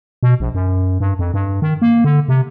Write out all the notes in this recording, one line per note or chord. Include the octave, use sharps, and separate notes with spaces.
B2
A#1
F#2
G2
F2
G2
D#3
A#3
D3
C3